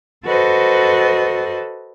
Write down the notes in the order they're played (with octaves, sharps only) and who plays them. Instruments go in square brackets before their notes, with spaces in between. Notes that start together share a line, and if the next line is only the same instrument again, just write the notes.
[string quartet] F#4 A4 B4 C5 D#5